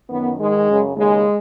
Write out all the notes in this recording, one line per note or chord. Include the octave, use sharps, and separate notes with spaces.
F#2 D#3 B3
G#2 D#3 G#3
F#2 C#3
D#2 C#3 G#3